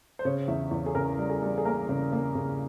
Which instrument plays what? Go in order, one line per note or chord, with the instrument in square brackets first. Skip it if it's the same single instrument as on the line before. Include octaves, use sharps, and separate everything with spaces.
[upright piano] C5
C#3 C#5
E2 E5
E2
G#4
C#3 A#4
G3
G#4
G3
G#4
A#3 A#4
C#3
A#3
C#3